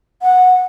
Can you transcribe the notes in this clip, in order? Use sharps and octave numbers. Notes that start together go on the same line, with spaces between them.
F#5